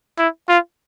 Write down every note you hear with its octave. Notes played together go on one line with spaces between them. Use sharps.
E4
F4